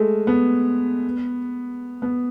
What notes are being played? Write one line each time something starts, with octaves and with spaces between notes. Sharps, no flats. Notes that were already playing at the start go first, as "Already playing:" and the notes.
Already playing: G#3 A3
B3
B3